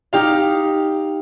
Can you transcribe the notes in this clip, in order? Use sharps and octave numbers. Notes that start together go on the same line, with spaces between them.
D#4 G4 F5